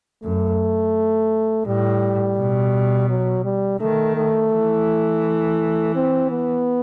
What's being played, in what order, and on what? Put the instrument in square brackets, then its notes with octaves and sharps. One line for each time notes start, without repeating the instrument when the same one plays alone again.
[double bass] F#2 [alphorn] A3
[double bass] A2 [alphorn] G3
[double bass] B2
[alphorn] F#3
G3
[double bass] D#3 [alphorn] A3
[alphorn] A3
[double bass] E3
[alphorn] C4
B3